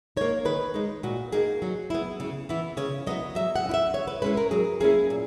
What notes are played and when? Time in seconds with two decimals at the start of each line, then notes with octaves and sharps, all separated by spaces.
0.17 A#3 D#4 C#5
0.45 D#3 B4
0.74 G#3 D#4
1.03 A#2 F#4
1.32 A#3 D#4 G#4
1.62 F#3
1.90 B3 E4
2.20 C#3
2.49 E3 B3 E4
2.77 C#3 C#5
3.06 F#3 B3 E4 D#5
3.35 F#3 E5
3.56 F#5
3.64 C#4 E4
3.74 E5
3.94 C#3 C#5
4.07 B4
4.22 G#3 C#4 E4 B4
4.37 A#4
4.51 F#3 G#4
4.80 A#3 C#4 E4 G#4
5.10 A#2